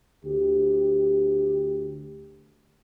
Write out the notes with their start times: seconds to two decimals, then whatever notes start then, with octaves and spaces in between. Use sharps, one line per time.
0.24 D2 G4